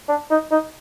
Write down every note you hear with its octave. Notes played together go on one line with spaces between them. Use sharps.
D4
D#4
D#4